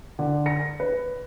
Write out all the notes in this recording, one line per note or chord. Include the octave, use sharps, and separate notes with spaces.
D3
A#6 C#7
B4